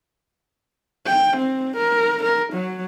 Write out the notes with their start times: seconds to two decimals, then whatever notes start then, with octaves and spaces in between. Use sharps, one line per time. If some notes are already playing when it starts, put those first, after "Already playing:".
1.06 G5
1.38 C4
1.77 A#4
2.23 A#4
2.53 F#3